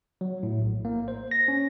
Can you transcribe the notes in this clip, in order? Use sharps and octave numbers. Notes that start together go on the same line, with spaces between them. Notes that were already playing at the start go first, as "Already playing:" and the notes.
F#3
A2
A#1
A#3
C5
A#6
C#4